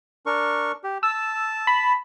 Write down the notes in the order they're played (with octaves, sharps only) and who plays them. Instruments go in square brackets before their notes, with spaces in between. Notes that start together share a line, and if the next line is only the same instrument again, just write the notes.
[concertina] D4 A#4 C#6
G4
[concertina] A5 [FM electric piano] E6
[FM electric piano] B5